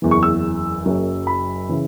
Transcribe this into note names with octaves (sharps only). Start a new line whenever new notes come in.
F#1 E2 E3
C#6
E6
F#1 F#2 F#3
B5
C#3 E3